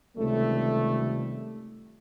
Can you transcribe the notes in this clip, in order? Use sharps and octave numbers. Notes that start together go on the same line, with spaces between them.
C#2 C3 D#3 G3 A3